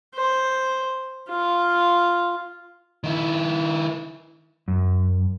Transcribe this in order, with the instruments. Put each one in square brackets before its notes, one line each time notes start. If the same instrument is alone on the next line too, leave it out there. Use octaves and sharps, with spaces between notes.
[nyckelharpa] C5
F4
[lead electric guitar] D#3 E4
[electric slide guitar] F#2